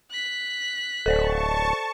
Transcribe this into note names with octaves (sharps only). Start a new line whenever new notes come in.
F#6 B6
D1 A4 C5 D5 A5 C#6